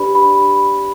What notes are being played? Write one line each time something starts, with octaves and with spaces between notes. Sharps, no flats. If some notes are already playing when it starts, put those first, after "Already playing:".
Already playing: D4 G4 B4 D5 B5
B5